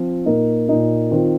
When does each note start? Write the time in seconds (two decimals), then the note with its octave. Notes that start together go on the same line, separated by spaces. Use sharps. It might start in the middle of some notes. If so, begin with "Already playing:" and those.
Already playing: F3 C4 F4
0.26 A#2 A#3 D#4
0.69 A#2 A#3 D#4
1.11 D#3 C4 F4